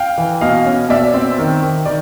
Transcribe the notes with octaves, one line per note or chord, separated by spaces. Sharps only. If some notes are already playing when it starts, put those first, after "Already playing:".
Already playing: F5 G5
E3
B2 D#5 F5
C#4
B2 D5 E5
C4
D#3
D#3
D#3 D5